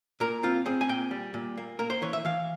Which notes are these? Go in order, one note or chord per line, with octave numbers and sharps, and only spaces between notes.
A#2 A#4
C4 F4
C4 G#4
G#5
A#2 G5
G3
A#2
A#3
A#3 A#4
C5
E3 C#5
E5
E3 F5